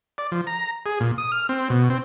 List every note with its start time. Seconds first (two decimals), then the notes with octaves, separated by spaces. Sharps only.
0.18 D5
0.32 F3
0.47 A#5
0.86 G#4
1.00 A#2
1.18 D#6
1.32 F6
1.49 C4
1.70 B2
1.90 C4